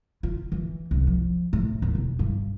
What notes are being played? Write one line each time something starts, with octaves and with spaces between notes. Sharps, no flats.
F4
E3
C2
F3
A2
D#2
E1
G2